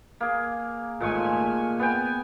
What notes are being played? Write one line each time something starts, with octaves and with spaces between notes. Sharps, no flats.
A#3 G#4
G#1 A#2 G#3 A3 G#5 C#6
B3 G5 G#5